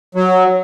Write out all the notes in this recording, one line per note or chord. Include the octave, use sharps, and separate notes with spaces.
F#3